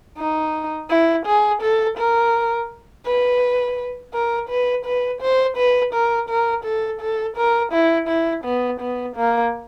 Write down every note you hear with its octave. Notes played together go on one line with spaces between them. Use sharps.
D#4
E4
G#4
A4
A#4
B4
A#4
B4
B4
C5
B4
A#4
A#4
A4
A4
A#4
E4
E4
B3
B3
A#3